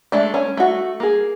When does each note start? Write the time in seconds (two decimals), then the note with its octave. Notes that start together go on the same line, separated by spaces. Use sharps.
0.12 G#3 A3 D4
0.34 C#4
0.57 A3 F#4
1.00 A#3 G#4